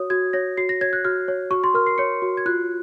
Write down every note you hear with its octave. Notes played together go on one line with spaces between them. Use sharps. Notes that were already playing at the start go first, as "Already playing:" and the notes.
Already playing: F#4 C#5 D#6
F#4 G#6
C#5 A#6
F#4 C7
A#6
C#5 G#6
F#6
F#4 F6
C#5
F#4 C#6
C6
A#4 F6
C7
C#5 C#7
F#4
G#6
F4 F#6